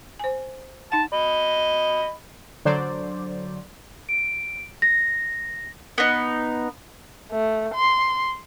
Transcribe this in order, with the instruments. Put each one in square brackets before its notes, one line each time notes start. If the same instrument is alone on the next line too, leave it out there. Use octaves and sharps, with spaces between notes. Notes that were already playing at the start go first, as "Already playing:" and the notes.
[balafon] C5 G#5
[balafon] D#4 F#5 [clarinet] A5
[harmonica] D#5 B5
[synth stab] D3 F#3 C5 D5
[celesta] D7
A#6
[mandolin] B3 D#4
[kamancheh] A3
C6